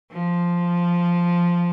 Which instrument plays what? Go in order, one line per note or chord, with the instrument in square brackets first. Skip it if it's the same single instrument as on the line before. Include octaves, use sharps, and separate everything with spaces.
[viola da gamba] F3